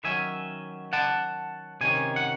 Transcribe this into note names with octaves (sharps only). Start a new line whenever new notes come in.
D#3 F#3 C#4 E5 G#5
F#5 A5
C3 D#3 C#4 G#5
F#5